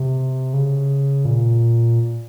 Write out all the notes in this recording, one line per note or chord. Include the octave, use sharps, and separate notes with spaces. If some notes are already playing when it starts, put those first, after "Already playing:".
Already playing: C3
C#3
A#2